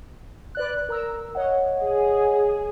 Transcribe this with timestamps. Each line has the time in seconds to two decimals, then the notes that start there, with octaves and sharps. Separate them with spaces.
0.55 B4 D5 F#6
0.89 A#4 A#5 E6
1.35 C#5 D#5 F#5
1.82 G#4